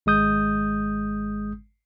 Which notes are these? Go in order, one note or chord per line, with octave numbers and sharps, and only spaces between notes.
G#1 G#3 D#6 G6